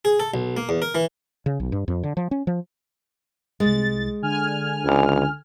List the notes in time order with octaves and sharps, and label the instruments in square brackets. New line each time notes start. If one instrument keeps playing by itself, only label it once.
[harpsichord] G#4
A4
B1
A#3
E2
A#4
E3
[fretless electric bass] C#3
B1
G2
F2
D3
F3
C#4
F3
[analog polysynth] C2 A6 [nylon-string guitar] G#3
[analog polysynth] D3 G#5 F6
[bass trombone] C#2